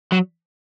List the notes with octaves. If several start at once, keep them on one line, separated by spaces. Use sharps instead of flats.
F#3